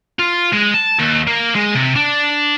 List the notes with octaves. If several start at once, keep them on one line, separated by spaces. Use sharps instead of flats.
F4
G#3
A5
D#2
A#3
G#3
C3
D4